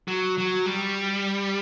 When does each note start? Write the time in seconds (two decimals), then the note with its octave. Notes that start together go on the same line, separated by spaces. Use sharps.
0.08 F#3
0.38 F#3
0.66 G3